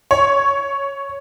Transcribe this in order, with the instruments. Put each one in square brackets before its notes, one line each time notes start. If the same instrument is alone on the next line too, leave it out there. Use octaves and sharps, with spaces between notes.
[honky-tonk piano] C#5